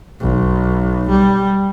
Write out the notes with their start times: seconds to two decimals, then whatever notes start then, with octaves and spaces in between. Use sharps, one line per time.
0.21 B1
1.09 G3